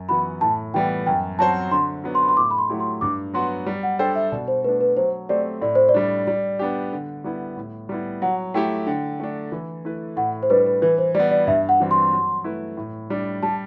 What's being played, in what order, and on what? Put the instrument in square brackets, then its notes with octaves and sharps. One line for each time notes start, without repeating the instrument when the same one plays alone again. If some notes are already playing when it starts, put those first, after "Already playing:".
Already playing: [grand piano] F#2
[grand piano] E3 B3 F#4 [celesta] B5
[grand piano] A2 [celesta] A5
[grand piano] E3 G3 B3 [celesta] G5
[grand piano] F#2 [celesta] G5
[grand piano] F#3 C4 F#4 C5 [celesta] A5
[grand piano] D3 [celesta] C6
[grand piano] F#3 B3 D4
[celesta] C6
B5
C6
[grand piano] A2 [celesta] D6
[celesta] B5
C6
[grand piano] F#3 A3 E4 G4
[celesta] C6
[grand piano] G2 [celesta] D6
[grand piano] F#3 B3 F#4 [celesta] C6
[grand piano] G3
[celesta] F#5
[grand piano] D4 A4 C5 [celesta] G5
[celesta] E5
[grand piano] B2 [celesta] D5
[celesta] C5
[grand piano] A3 [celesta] B4
[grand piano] D4
[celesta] B4
[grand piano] F#3 [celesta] C5
[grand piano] A3 C4 G4 C5 [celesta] D5
[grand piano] A2 [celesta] D5
[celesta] C5
D5
[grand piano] G3 D4
G3
B3 D4 G4
D3
G3 B3 E4
A2
G3 B3 E4
[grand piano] F#3 [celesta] F#5
[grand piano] A3 E4 G4 [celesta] G5
[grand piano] D3 [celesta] G5
[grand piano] A3 D4
E3
A3 E4 B4
[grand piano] A2 [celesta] F#5
[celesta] C5
[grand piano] G3 D4 [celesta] B4
[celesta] B4
[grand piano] E3 [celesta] B4
[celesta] C5
[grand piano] G3 [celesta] D5
[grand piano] B3
[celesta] D5
[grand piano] G2 [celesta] E5
[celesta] F#5
[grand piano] E3 G3 C4 F#4
[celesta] C6
[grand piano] F#3
A3 E4 B4
A2
G3 D4
[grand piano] G3 [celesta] A5